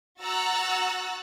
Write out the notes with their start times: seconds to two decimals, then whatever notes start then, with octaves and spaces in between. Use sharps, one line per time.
0.21 F#4 F#5 A#5 E6 F#6 A6